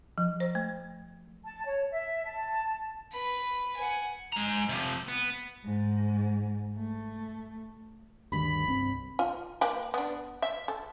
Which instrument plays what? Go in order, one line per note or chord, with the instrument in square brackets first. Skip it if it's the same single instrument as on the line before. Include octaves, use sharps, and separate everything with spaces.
[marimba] F3
C5
A3
[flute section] A5
C#5
E5
A5
[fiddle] B4 B5
F#5 G#5
[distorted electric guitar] G#3 A#5
C3 F3
B3
[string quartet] G#2
A3
[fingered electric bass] D2 G2 D#3 [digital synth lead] B5
[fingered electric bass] C2 G2 C4
[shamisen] F4
A#3 B4 G5
B3 D4
E5
A4